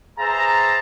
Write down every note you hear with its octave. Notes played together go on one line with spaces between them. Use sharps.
G#4 B4 C5 E5 A5 A#5